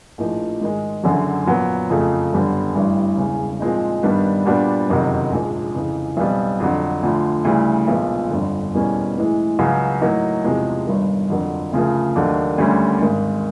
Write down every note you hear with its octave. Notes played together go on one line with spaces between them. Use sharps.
A#1 A2 F3 A#3 D#4
G#2 D#3 G#3
F#1 F#2 D3 F#3
A#2 F#3 B3
F2 C#3 F3 A3
G1 F#2 D3 G3 B3
A1 G2 E3 G3
E1 E2 C#3
A#2 F3 G#3 C4 D#4
G2 D#3 G3 B3 D4
A#2 G3 B3 D4 F#4
F#1 F2 C3 D#3 F#3
A#1 G#2 F3 G#3
F2 C#3 E3
B1 B2 G3 C4
F2 D3 F#3
D2 D3 F3
D2 C#3 E3 G3
B1 A#2 F3 G#3 B3
G1 F2 D3
E2 B2 G3 A#3 C#4
A2 E3 G#3
C#2 C#3 F#3
A2 F#3 A#3 D#4
E2 C3 F3 G#3
G1 G2 D#3
F2 D3 F#3 A#3
D2 C#3 F3 A#3
D#2 D#3 F#3 A3 D4
D2 D3 G3 A#3 C#4
G#1 G#2 D#3